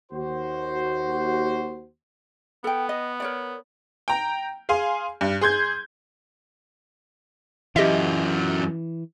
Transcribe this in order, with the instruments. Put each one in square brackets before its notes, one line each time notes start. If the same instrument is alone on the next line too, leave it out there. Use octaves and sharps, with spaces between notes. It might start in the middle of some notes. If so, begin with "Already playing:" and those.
[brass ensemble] D#2 F#4 C5
[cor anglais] B3 [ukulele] A4 G5
[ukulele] D#5
A#4 C#5 D5
[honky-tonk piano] G5 A#5
G#4 F5 G#5 C6
G2
G#4 C6 G6 G#6
[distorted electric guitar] F#2 F4 [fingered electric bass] E3 [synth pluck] G4 D#5 E5